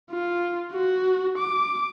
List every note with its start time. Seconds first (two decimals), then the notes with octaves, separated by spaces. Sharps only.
0.11 F4
0.72 F#4
1.38 D6